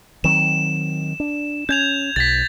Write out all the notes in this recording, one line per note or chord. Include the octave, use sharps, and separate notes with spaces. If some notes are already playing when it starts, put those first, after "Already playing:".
D#3 F#3 C4 E7
D4
C#4 G6 G#6 F7
B1 A6 B6